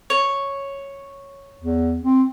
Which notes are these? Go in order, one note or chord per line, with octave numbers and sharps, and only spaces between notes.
C#5
E2
C4